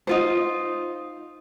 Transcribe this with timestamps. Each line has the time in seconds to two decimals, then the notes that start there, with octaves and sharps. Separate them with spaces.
0.07 D#4 F4 C5